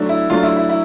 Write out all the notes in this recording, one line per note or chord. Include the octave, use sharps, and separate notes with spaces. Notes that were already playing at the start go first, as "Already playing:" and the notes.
Already playing: F#3 A3 D4
E4
F#3 A3 D4 F4
E4
E4
E4